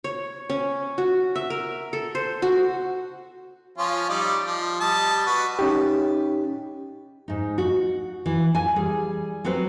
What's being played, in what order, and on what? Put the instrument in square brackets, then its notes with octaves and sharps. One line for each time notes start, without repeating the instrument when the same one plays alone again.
[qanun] C#5
C#4
F#4
E5
A#4
A4
C5
F#4
[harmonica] F3 C#4 F4
G3 D#4 D5
F3
G3 D#5 A5
F#4 B4
[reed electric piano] C#4 D#4 G4
[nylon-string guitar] G#2 D#4
F#4
E3
G#5
G3 G#4
F#3 C4 F#4 B4 C5